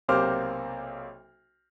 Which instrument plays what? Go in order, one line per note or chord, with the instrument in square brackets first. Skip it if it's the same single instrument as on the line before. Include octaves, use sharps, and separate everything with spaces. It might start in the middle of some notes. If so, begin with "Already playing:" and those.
[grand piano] B1 C3 A#3 C5 D6 F6